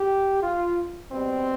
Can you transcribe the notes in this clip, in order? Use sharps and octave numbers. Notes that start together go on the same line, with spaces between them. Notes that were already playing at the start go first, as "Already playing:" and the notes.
Already playing: G4
F4
B2 G3 C4